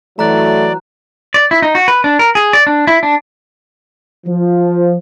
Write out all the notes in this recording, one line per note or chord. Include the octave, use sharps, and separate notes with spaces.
E3 F#3 A3 D5 A#5 F#6
D5
E4
D#4
F#4
B4
D4
A#4
G#4
D5
D4
E4
D4
F3